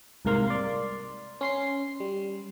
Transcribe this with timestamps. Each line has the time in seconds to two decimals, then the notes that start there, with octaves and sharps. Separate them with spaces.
0.25 C2 G#2 C3 A#3 F5 C6
0.48 D5 C6
1.41 C#4 C6 C7
2.00 G3